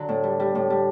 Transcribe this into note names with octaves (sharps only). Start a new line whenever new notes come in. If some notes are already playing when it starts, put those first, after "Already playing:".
Already playing: D3 F#3
A2
G3
G3
A2
G3